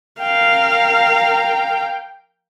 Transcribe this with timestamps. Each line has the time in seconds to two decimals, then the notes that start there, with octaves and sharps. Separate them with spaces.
0.20 A#4 F5 G5